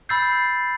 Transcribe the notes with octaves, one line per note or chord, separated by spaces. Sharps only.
B5 E6 G6 A6 C7